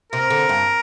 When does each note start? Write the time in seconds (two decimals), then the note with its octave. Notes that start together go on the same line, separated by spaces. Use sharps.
0.12 C3 A#4
0.30 D3
0.49 G2